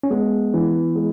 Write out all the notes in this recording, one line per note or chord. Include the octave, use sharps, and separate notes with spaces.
C#4
G#3 B3
E3
G#3